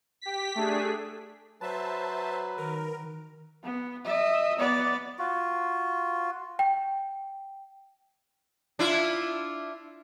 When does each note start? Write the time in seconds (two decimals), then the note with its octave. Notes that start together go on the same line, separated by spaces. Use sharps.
0.21 G4 B6
0.55 A3 D4 G#4
1.61 F#3 B4 C5 E5 A5
2.58 D#3 A#4
3.64 B3
4.05 D#5 E5
4.59 B3 D5
5.19 F4 F#4
6.59 G5
8.79 D4 E4 F4